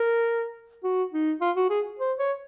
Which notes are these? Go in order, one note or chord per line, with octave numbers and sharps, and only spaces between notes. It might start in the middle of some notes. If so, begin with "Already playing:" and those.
Already playing: A#4
F#4
D#4
F4
F#4
G#4
C5
C#5